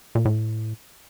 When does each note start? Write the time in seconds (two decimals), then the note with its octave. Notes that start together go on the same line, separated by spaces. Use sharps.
0.15 A#2
0.25 A2